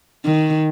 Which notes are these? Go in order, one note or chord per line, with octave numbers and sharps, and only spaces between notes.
D#3